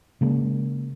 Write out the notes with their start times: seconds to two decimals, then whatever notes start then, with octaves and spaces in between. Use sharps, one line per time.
0.21 C#3 G#3 A#3